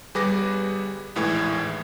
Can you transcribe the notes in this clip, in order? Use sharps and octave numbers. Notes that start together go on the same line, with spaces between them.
G1 G3 G#4 B4 D6 A#6
A#1 D#2 A2 E3 G#3